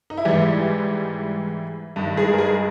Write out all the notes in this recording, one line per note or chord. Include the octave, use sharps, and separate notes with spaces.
D#4
E4
G#2 E3 G3 G4
G2 D#3
G#3 G#4
A#4
G#3 G#4